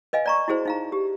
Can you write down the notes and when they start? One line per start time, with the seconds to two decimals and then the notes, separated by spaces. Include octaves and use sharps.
0.13 B4 D#5 F5 G#5
0.26 D5 A#5 C#6
0.48 E4 F#4 G#4 C5
0.65 D#4 F5 A#5
0.92 G4